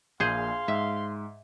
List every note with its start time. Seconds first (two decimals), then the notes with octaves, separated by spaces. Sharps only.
0.20 A#1 A#2 G#4 C5 F5 C6
0.68 G#2 E5